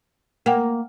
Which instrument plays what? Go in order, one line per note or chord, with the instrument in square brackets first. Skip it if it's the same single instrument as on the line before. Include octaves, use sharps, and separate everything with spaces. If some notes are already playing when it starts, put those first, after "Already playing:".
[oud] A#3 [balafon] F#5 G5